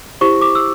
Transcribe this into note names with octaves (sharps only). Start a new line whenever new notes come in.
E4 G4 C5 C#6
D6
E6